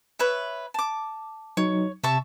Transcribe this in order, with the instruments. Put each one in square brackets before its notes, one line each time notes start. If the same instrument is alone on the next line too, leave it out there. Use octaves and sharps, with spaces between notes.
[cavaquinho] B4 C#5 E5
A5 D6
[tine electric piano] F#3 D#4 [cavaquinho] C#5
[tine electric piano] C3 [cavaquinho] E5 A5 C#6